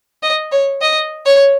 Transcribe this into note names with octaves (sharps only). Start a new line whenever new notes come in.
D#5
C#5
D#5
C#5